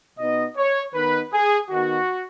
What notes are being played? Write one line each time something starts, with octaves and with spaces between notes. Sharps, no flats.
B2 B3 D#4 D#5
C#5
D#3 B3 D#4 B4
G#4
D#3 B3 D#4 F#4